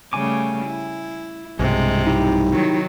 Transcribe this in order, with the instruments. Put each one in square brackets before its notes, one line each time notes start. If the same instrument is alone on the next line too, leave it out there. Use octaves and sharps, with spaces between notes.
[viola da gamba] C#3 G3 A3 [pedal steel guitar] G#5 D6
[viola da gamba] E4
[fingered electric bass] B1 G2 G3 [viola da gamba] C3 [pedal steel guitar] G#3
[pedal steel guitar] D#4 E4 G4
[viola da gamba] D#3 F#3